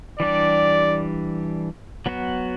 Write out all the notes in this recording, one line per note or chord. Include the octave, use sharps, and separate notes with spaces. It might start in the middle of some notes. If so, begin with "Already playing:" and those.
E3 G3 D4 G4 D5
F#3 B3 F#4